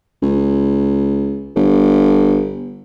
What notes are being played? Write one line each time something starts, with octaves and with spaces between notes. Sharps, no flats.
C#2
G1